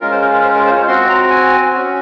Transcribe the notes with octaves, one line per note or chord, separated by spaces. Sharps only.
G#3 C#4 F4 A#4
C5
A#4
C5
A#4
C5
C#5
C4 F#4 C6
A#5
G#5
C#4 F#4